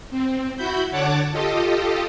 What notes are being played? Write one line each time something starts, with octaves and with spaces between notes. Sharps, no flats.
C4
E4 F#4 B5 G6
D3 C#5 F#5 A5 D6
F4 G4 A4 D#5